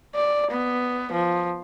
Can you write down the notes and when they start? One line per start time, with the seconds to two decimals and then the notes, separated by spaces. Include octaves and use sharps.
0.15 D5
0.51 B3
1.12 F3